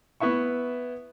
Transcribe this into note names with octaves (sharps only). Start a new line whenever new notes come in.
B3 E4 E5 C#6